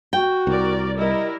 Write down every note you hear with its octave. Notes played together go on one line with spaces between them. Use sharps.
F#4 G5
C2 A#4 D5
G3 E4 A#4 D#5